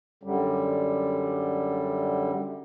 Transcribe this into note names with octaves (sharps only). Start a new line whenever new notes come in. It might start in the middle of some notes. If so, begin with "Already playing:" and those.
F#2 D3 G3